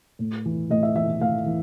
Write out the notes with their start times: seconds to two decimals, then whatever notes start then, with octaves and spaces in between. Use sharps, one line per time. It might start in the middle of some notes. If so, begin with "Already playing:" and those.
0.19 A2
0.45 E3
0.70 A2 D#5
0.83 E5
0.96 E3 E5
1.21 A2 F5
1.46 E3